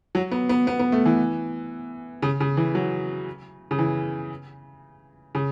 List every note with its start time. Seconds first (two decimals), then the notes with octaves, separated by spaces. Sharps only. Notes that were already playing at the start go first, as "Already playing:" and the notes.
0.15 F#3
0.31 B3
0.49 B3
0.67 B3
0.79 B3
0.92 A3
1.06 E3
2.23 C#3
2.40 C#3
2.57 E3
2.75 F#3
3.71 C#3
3.79 E3
5.35 C#3